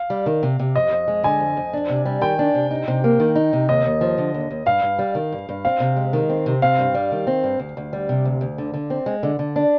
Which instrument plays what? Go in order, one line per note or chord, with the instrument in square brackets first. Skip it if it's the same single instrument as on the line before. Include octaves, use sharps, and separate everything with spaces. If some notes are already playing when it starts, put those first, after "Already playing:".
Already playing: [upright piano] F5
[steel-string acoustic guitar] G3
D#3
C3
C3
[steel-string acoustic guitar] F2 [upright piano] D#5
[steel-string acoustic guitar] F2
G#3
[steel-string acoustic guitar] D3 [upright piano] G#5
[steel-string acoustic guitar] F2
F2
D4
C3
G3
[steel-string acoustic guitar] D#3 [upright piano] G5
[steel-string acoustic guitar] D4
C3
D#4
C3
A#3
D#3
D#4
C3
[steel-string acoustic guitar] D#2 [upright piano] D#5
[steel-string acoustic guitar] D#2
F3
D3
D#2
D#2
[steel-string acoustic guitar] G2 [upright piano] F5
[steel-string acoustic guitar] G2
G3
D#3
G2
G2
[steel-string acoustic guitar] C4 [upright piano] F5
[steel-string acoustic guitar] C3
G#3
D#3
C4
C3
[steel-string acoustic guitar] C4 [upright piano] F5
[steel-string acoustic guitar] G2
G3
D#3
C4
G2
D2
D2
G3
C3
D2
D2
D3
D3
C4
G#3
D3
D3
D4